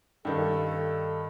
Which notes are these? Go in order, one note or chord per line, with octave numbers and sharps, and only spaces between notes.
G2 D#3 A4 D#5 F5 G5